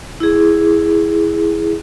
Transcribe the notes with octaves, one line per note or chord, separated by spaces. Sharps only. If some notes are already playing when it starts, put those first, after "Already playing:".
E4 G#4